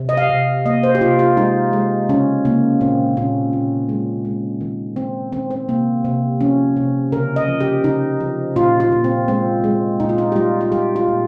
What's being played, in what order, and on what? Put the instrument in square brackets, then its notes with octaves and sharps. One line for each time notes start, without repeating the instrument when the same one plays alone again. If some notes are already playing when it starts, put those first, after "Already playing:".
Already playing: [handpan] C3
D#5
F5
C3
A#3 D#5
C5
G4
C3 F4
F4
G#3 D#4
G#3
C#3 C#4
C#3 A#3
A#2 C4
A#2 C#4
A#2
G#3
G#3
D#3
D#3 C4
D#3 C4
C4
C3 A#3
C3
F3 C#4
C3
C#3 A#4
D#5
F3
G4
C#3 D#4
F3
A#2 F4
F4
A#2
C4
G#3 C4
G#3
A#2 D#4
F4
D#4
G4
G3 F4
F4
G3 G4
F4
A#2